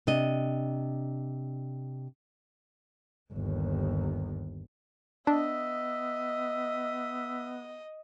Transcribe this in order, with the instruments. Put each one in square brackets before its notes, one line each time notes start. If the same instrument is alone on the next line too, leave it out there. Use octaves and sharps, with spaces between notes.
[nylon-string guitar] C3 D4 D#5
[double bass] G1 D#2
[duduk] B3 [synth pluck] D4 [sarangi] D#5 [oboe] E5